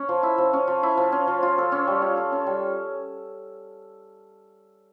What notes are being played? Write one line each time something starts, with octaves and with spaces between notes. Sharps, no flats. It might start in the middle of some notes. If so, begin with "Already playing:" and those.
Already playing: C#4
F3
E4
F3
C#4
F3
E4
F3
C#4
F3
F4
A4
C#4
G3
F4
A4
C#4
G3